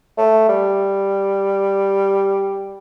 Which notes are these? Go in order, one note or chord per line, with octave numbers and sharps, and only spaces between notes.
A3
G3